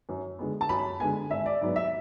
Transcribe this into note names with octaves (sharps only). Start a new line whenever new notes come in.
F#2
D3 G#3 B3
A5
F#2 B5
D3 G#3 B3 G#5
G#1 E5
D5
G#2 F#3 B3 D5
E5